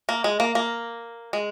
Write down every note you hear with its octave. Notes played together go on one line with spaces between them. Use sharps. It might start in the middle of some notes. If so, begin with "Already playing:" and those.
A#3
G#3
A#3
A#3
G#3